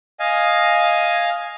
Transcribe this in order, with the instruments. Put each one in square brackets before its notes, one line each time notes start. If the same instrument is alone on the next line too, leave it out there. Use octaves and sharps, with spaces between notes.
[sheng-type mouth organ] D#5 F5 G#5